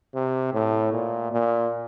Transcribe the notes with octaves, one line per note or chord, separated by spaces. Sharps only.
C3
A2
A#2
A#2